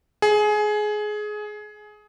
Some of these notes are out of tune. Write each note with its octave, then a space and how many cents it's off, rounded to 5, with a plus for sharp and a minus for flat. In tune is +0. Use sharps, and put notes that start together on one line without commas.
G#4 +20